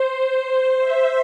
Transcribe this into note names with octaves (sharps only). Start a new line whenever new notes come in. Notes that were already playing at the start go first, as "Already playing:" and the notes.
Already playing: C5
E5